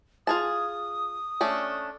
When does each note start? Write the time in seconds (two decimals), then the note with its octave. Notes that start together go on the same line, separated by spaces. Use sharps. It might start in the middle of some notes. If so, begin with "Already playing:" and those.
0.27 F4 G#4 A5 D#6
1.41 A3 C#4 D4